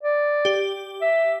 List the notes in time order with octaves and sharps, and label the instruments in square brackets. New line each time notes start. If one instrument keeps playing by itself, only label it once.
[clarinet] D5
[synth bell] G4
[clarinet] E5